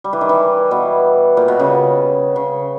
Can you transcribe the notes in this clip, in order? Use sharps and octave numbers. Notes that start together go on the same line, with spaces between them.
G3
E3
D#3
E3
B2
A#2
B2
C#3
C#3